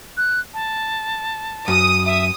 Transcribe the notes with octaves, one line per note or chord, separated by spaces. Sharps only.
F#6
A5
F#2 D#6
E5 D#6